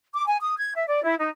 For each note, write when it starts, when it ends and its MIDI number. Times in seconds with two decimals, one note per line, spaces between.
0.14 0.25 86
0.27 0.38 80
0.42 0.55 87
0.57 0.72 92
0.76 0.86 76
0.88 1.03 74
1.04 1.15 64
1.19 1.29 63